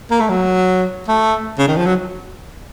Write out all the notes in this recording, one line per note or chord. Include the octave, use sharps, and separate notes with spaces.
A#3
A3
F#3
A3
C#3
D#3
F3
F#3